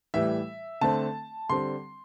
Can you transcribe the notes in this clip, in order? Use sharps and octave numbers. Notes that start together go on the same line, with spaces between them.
A2 E3 G3 E5
D3 A3 C4 A5
D3 G3 C4 C6